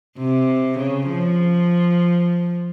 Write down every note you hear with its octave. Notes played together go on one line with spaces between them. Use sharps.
C3
C#3
F3